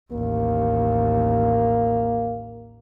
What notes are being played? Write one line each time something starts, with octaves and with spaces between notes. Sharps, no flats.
A1 D#2 A#3